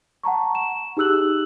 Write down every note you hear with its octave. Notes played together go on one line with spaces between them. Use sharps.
F#5 A5 A#5 C#6
E7
D#4 G4 G#4 E6 F#6 F#7